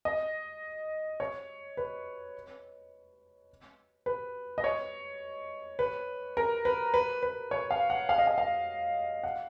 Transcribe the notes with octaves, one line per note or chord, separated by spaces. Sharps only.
D#5
C#5
B4
B4
D#5
C#5
B4
A#4
B4
B4
B4
C#5
F5
F#5
F5
D#5
F5
F5
F#5